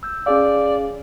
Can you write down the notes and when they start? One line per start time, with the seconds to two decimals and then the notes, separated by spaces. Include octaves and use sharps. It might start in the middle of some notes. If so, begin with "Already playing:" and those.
0.03 E6 G6
0.26 C#4 G#4 D5 F5